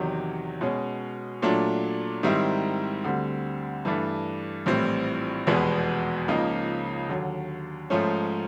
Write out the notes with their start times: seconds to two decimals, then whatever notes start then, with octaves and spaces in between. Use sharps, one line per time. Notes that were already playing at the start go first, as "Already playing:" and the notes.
Already playing: E2 C3 D#3 F#3
0.61 B2 G#3 C#4
1.42 A#2 F#3 A3 D4
2.23 G#2 D#3 G3 C4 E4
3.04 D2 D3 G3 C4
3.85 G2 E3 A3 D4
4.66 A#1 A2 E3 G3 C4
5.47 F1 E2 B2 G#3 B3
6.28 C#2 C#3 F3 A#3 D#4
7.09 D#2 D3 F#3
7.90 G#2 F3 A3 C#4